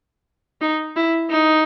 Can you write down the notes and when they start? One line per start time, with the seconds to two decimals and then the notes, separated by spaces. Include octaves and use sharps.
0.61 D#4
0.96 E4
1.30 D#4